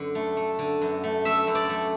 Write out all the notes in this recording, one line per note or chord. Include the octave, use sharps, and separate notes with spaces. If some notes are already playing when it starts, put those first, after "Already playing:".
Already playing: F#2 D3
A3
A3
D3
F#2
A3
A3 E5
F#2
D5
A3